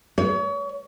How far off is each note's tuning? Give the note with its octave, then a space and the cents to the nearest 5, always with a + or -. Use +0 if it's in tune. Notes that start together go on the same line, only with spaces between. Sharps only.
C#5 +35